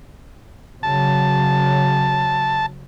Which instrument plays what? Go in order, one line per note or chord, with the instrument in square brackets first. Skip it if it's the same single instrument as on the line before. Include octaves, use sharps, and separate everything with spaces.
[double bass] C#3 F#3 [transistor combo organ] A5